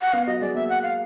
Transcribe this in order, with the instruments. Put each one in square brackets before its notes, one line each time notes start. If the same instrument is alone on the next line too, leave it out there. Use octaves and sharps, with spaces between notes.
[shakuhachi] F#5
[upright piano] B3 [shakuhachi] F5
[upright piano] F#3 [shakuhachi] D#5
[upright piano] G#3 [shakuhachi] D5
[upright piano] A#3 [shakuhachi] E5
[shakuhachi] F#5
F5